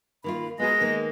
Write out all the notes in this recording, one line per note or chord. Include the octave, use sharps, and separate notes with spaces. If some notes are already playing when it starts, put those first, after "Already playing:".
D#3 A#3 F4 B5
G#3 B3 F#4 A#4 A#6
D#3 A#3